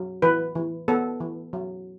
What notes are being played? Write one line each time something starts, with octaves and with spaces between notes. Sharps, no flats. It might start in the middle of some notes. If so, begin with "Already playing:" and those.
Already playing: F#3
E3 B4
E3
B3 A4
E3
F#3